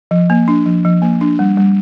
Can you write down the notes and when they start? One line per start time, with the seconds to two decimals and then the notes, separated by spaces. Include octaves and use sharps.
0.11 F3
0.30 A#3
0.48 D4
0.66 F3
0.85 F3
1.02 A#3
1.21 D4
1.39 G3
1.57 G3